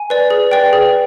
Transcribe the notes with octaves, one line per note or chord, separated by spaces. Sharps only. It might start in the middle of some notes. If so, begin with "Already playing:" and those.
Already playing: G#5
B4 D5
G#4
B4 D5 G5
G#4